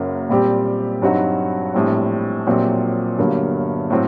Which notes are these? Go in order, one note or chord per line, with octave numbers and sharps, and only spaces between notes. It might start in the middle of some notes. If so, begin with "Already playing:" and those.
Already playing: F#1 F#2 F#3 A#3 F#4
A#2 G3 C4 G4
G2 F#3 C4 D#4 F#4
A#1 A2 G3 C4
A#1 A#2 F#3 C4 G4
G1 G2 F#3 A#3
A2 F#3 C4